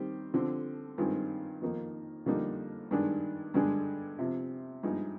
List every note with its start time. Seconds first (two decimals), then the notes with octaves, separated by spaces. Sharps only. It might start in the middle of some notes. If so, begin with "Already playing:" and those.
Already playing: D#3 G3 C4 G4
0.34 D3 F3 C4
0.98 G2 D#3 G#3 C4 F4
1.62 F2 D#3 A#3 D#4
2.26 F2 D3 G3 A#3 D#4
2.91 G2 D#3 G#3 D4
3.54 G2 D3 G#3 D4
4.19 C3 F3 C4
4.83 G2 F3 G#3 D#4